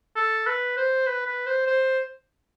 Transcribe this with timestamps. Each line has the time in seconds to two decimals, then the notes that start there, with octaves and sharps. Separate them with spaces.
0.16 A4
0.47 B4
0.77 C5
1.07 B4
1.27 B4
1.47 C5
1.67 C5